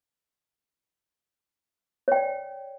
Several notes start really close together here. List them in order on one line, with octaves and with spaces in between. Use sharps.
C#5 G5 D5